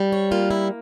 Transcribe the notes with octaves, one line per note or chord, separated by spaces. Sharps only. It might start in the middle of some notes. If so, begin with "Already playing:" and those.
Already playing: G3
C#5
A#3 F4
E4